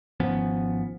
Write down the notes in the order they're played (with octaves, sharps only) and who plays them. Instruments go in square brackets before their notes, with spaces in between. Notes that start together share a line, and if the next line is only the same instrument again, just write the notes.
[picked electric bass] G#1 F3 B3 C#4